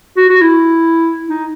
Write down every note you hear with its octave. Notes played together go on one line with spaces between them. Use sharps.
F#4
F#4
E4
D#4